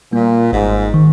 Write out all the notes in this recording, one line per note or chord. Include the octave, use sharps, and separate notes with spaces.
A#2 G3 A#3 F4
G#1 G#2
D#3